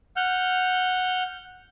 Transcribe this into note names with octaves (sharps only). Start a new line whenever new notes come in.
F#5 F6 G6